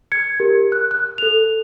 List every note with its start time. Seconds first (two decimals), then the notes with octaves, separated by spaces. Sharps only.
0.12 G#6 C#7
0.40 G4 A#4
0.72 F#6
0.91 F#6
1.18 A4 F7